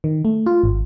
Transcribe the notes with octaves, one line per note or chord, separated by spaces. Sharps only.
D#3
A3
F4
G#1